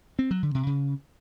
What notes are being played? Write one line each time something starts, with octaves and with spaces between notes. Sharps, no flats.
C4
F#3
D3
C3
C#3